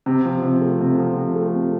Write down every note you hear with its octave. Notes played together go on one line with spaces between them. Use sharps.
C3
F3
C3
A3
C3
F3
C3
A3
C3